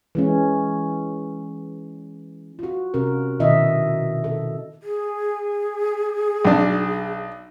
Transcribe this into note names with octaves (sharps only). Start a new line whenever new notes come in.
E3 G#3 C#4
F4 F#4
C3 C#4 A#4
B2 D#3 E4 D#5 E5
A4
G#4
B1 D4